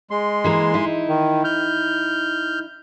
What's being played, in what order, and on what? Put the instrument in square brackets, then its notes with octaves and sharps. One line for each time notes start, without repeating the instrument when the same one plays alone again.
[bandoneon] G#3 C6
[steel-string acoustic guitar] E3 A#3 G#4
D#4 E4
[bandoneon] D#3
F6 G6